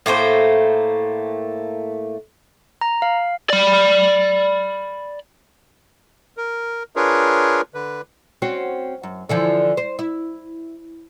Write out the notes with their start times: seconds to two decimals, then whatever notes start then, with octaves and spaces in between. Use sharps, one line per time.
0.06 A2 A3 A#3 C5
2.81 A#5
3.02 F5
3.50 D5 B5
6.37 A#4
6.96 D4 F4 G#4 A#4 B4 C#5
7.74 D3 B4
8.42 C4 C#4 F#4
9.03 F#2
9.29 D3 E3 F3
9.77 C5
9.99 E4